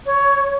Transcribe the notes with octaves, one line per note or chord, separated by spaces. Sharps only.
C#5